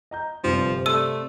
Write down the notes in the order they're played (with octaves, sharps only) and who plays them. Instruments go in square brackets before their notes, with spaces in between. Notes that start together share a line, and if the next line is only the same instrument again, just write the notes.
[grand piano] D#5 A#5 G6
[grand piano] G1 G2 G4 [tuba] C3 [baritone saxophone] F3
[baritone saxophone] A3 [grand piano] D5 A5 C6 [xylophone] E6 D#7